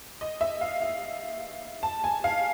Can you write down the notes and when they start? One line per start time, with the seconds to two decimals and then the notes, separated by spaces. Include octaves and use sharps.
0.21 D#5
0.41 E5
0.61 F5
0.81 F5
1.83 A5
2.04 G#5
2.24 F5